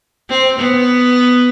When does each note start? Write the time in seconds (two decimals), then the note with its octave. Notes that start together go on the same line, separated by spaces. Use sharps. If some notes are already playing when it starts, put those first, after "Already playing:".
0.29 C4
0.58 B3